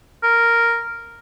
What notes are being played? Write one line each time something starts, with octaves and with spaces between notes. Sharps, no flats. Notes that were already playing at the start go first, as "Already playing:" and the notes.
A#4